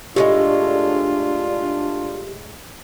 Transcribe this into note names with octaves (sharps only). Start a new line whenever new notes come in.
A2 F3 G#3 D4 F4 G4